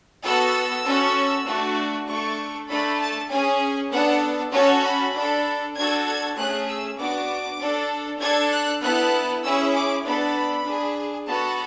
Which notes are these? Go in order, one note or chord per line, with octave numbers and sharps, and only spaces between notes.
B3 F#4 A4 E6
C#4 F#4 A4
A3 D4 F#4
A3 D4 A4 C#6
A3 D4 A4 B5
A5
C#4 G#4 G#5
B3 D4 A4 F#5
C#4 F#4 A4 C#5
B5
D4 A4
D4 F#4 A4 G#6
G#6
A3 C#4 G#4 F#6
E6
B3 D4 F#4 D6
D4 A4
D4 A4 G#6
F#6
B3 E4 A4 F#6
C#4 E4 G#4 E6
D6
B3 D4 A4 B5
D4 G#4
B3 F#4 A4 A5